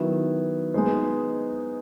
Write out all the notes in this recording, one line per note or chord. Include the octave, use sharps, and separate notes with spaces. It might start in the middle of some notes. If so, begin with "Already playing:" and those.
Already playing: D#3 F#3 B3 E4
G#3 B3 D#4 G#4 C5